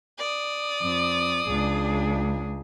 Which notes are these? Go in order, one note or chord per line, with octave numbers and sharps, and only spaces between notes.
D5 D#6
F2
C#2 D4 G#4